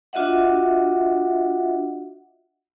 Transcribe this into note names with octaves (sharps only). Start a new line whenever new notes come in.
D4 F4 F#4 D#5 E5 F#5